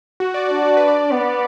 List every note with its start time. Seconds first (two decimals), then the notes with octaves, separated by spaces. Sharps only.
0.20 F#4
0.34 D5
0.49 D4 D5
0.65 D5
0.77 B4
0.88 D5
1.11 B3